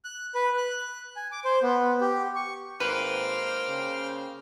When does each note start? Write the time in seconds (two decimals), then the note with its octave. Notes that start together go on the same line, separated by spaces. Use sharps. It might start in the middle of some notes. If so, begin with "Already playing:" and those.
0.04 F#6
0.35 B4
0.58 F#6
1.16 G#5
1.32 D6
1.45 C5
1.63 B3
2.01 G4
2.35 C#6
2.80 G#1 A#3 B4 C5 G5 F6
3.69 C#3